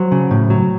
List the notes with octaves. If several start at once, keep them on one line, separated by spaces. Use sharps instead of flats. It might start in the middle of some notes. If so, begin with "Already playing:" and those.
Already playing: F#3 C5
C#3
A2
F#3